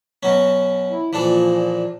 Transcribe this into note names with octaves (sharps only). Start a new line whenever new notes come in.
B2 F#3 C#4
E4
A#2 E3 F3 D4 A4